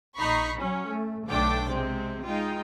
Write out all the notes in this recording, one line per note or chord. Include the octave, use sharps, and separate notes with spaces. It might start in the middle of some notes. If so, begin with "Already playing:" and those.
A#1 D#4 A#5 B5 C#6 C7
F#3 C#4
A3
B1 D3 A3 D4 G5 D6
C3 G#3 C4
G#3 D#4 F4 G5